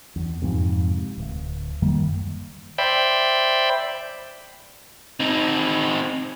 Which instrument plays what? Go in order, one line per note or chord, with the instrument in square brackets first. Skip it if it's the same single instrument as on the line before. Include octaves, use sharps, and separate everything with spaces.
[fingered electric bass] E2
F2 G#2 C3
D1
F#2 D#3 G3 A#3
[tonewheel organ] C5 D5 E5 G5 B5
[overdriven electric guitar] C4 D#4